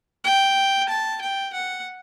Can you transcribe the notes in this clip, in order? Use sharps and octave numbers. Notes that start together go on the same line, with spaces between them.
G5
A5
G5
F#5